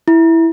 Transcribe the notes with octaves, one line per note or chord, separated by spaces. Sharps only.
E4